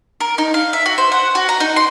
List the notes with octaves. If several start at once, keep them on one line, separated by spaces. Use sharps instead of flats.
A#4
D#4
F5
E5
F#4
C5
F#5
F#4
A#5
D#4
C6